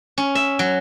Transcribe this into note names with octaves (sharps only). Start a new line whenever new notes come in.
C#4
E5
F#3